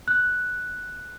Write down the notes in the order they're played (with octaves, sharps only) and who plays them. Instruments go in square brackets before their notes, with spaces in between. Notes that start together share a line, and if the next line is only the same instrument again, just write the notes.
[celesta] F#6